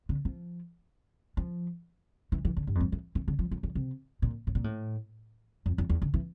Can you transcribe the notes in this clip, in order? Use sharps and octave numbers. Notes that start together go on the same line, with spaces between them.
D3
F3
F3
E3
E3
D3
G2
F2
G2
E3
E3
D3
F3
F3
E3
C3
A#2
A2
A#2
A2
F2
E2
E2
D3
E3